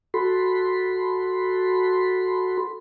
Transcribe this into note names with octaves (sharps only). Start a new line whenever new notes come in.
F#4 A4 B5 C6